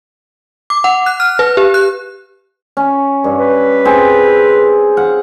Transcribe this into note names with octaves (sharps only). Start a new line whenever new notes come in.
D6
F#5
F#6
F6
B4
G4
F#6
C#4
G2
B4
C4 G#4
F5 F#5